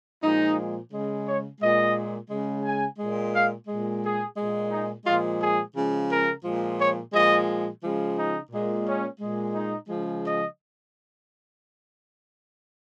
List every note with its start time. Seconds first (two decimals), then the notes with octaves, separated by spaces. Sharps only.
0.23 A#2 F3 G#3 D#4
0.92 C#3 G#3
1.26 C#5
1.61 A#2 G#3 D#5
2.30 C#3 G#3
2.64 G#5
2.99 A#2 G#3
3.34 F5
3.68 A#2 G#3
4.03 G#4
4.37 A#2 G#3
4.71 D#4
5.06 A#2 F3 G#3 F4
5.40 G#4
5.75 C#3 F3 G#3
6.09 A#4
6.44 A#2 F3 G#3
6.78 C#5
7.13 A#2 F3 G#3 D#5
7.82 C#3 F3 G#3
8.16 D#4
8.51 A#2 G#3
8.86 C#4
9.20 A#2 G#3
9.54 D#4
9.89 C#3 F3 G#3
10.23 D#5